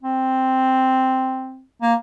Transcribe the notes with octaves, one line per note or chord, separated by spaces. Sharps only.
C4
A#3